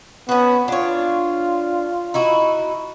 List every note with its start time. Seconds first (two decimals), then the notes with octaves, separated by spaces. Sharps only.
0.29 B3 C#4 F#4
0.68 D4 F4 C#5
2.14 D#4 E4 F#4